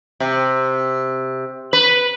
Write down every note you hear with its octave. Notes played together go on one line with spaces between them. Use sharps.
C3
B4